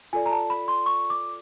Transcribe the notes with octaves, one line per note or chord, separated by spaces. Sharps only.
F4 A4 D5 G#5
A#5
A5
B5
C6
C#6
D6